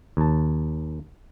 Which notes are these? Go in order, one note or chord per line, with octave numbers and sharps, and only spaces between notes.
D#2 A5